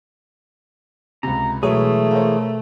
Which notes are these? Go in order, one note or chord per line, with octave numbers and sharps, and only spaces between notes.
C#2 C3 A#5
B2 E3 F#3 G#3 A3 G#4 C#5
A#4 C5 C#5 F5